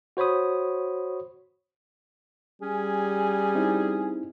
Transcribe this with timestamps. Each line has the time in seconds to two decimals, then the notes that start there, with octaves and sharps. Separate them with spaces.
0.17 F#4 C5 C#5 B5 D#6
2.62 G3 C#4 G#4
3.55 C4 D#4 E4